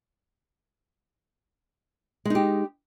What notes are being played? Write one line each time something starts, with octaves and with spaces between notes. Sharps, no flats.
G#3 D#4 G4